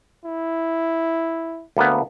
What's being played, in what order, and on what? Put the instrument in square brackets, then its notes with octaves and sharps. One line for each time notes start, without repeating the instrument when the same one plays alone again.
[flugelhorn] E4
[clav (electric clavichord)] D2 A#3 B3